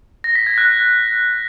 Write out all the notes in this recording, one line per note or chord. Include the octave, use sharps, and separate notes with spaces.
A#6
B6
G#6
F#6